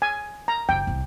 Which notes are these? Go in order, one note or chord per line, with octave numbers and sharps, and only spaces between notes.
G#5
A#5
F#1 D3 G5
C2 C3